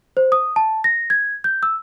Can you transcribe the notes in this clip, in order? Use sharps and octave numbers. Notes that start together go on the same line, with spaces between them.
C5
D#6
A5
A#6
G#6
G6
E6